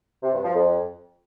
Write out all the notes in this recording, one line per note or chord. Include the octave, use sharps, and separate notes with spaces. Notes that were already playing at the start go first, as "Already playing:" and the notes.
C3
G2
F3
F2